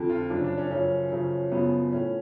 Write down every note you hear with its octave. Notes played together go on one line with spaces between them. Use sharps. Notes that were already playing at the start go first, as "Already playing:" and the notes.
Already playing: F2 D3 F3
F4
F#2 C#3 F3 D4
D4
C#4
F#2 C#3 F3 C#4
F#2 C#3 F3
F#2 C#3 F3 B3
A2 F3 C#4